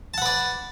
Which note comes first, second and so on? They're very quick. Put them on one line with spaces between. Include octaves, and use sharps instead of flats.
A5 F#5 B4 D5